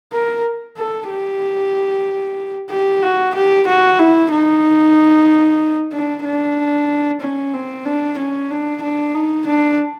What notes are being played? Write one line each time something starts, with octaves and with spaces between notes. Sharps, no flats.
A#4
A4
G4
G4
F#4
G4
F#4
E4
D#4
D4
D4
C#4
C4
D4
C#4
D4
D4
D#4
D4